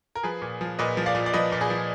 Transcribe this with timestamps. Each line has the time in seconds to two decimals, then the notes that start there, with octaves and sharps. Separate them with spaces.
0.15 A#4
0.23 F3 G#4 B4
0.42 A#2
0.61 F3
0.79 A#2 B4 D#5
0.97 F3
1.06 D5 F5
1.15 A#2
1.26 D5
1.33 F3 B4 D#5
1.52 A#2
1.61 G#4 B4
1.70 F3